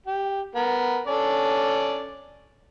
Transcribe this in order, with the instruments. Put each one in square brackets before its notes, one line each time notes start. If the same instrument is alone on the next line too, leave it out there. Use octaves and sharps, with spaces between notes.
[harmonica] G4
B3 A#4
C#4 A4 D5